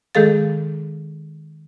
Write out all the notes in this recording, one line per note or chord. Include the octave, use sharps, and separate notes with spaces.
D#3 G#3 G#4 A4 F5 A6